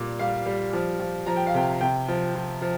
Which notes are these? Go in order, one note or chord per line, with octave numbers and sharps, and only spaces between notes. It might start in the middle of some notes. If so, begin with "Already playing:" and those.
Already playing: A#2 G3 D5
G3 F5
G3
F3
F3
F3 A#5
G5
F5
C3 G5
C3 G5
F3
F3
F3